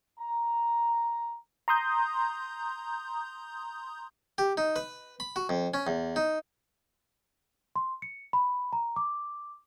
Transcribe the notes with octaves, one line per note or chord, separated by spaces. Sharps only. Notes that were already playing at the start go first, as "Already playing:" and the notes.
A#5
A#5 C6 D#6 G6
G4
D#4
B4
B5
F#4
F2
C#4
E2
D#4
C6
C#7
B5
A#5
D6